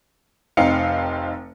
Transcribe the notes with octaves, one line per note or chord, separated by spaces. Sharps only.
F1 C4 D#4 F5 C#7